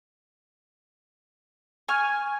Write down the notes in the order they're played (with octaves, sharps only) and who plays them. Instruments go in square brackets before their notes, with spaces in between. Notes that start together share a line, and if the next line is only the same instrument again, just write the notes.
[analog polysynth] G#5 [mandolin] C#6 F6